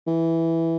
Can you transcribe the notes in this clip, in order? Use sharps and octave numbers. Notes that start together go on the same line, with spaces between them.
E3